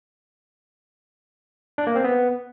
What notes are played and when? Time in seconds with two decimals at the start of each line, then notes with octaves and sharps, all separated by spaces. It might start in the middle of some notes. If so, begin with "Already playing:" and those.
1.78 D4
1.87 A#3
1.96 C4
2.04 B3